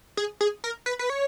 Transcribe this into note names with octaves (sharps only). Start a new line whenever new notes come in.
G#4
G#4
A#4
B4
B4
C#5